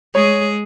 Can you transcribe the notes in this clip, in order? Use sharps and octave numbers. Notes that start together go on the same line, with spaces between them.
G#3 G#4 C#5